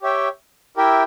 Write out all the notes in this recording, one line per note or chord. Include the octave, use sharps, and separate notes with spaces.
G4 C#5 E5 G5
E4 G4 A#4 E5 G5